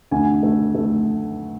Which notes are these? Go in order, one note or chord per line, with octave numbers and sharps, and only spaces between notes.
D2 G#5
A3
A3